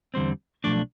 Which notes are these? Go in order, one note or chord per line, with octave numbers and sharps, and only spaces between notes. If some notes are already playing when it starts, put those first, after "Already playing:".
E2 D3 G3 C4 C5
B1 A2 F3 A3 D4 D5